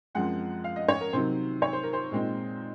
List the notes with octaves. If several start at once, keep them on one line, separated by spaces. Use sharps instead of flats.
F#2 F3 G#3 C4 F#5
F5
D#5
C#5
A#4
C3 D#3 F#3 C5
C#5
C5
A#4
C5
A#2 G#3 C4 D#4